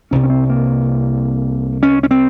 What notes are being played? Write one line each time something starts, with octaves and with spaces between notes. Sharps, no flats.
C2 C3 C#4
C#4
C4
A#3
C#4
C#4
C4